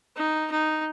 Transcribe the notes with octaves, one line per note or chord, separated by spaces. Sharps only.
D#4
D#4